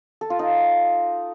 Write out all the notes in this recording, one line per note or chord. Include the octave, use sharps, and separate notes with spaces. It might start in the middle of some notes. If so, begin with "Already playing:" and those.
A4
F4
D#4